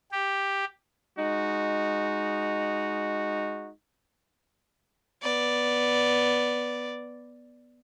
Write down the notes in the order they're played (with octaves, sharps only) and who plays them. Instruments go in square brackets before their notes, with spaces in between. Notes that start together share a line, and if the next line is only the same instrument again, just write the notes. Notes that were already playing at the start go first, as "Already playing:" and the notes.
[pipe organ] G4
[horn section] G#3 D#4 F#4
[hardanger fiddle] B3 D5